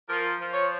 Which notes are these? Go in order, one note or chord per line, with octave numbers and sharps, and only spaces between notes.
F3 A#4
F3
C#5